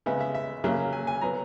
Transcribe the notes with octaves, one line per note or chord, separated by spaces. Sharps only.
C#3 G#3 B3 E5
E5
E5
C#3 F#3 A#3 E5
G#5
G#5
F#3 B3 A#5